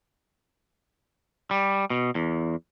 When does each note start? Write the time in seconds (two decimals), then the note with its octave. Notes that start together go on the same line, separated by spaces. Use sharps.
1.51 G3
1.90 B2
2.15 E2